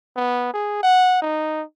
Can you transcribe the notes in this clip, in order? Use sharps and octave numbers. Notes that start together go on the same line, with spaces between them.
B3
G#4
F#5
D#4